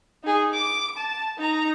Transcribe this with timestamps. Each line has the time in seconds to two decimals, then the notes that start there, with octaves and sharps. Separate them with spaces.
0.24 D#4 G#4
0.53 D6
0.97 A5
1.38 D#4 A#5